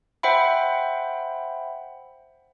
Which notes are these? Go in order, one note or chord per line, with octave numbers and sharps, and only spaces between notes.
C5 E5 F#5 G5 B5